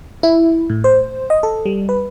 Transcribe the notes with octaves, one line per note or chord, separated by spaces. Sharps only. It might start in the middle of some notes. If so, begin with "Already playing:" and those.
E4
A2
C5
D#5
A4
G3
B4